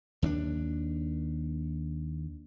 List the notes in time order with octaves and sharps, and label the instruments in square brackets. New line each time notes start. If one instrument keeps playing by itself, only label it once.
[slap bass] D#2 C#4 D4